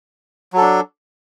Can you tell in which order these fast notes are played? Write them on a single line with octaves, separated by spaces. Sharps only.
F#3 A4 D4